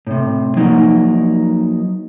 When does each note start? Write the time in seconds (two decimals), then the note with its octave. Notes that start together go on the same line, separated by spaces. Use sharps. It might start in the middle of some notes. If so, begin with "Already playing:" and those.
0.07 A2 C3
0.57 F3 F#3 A#3 D#4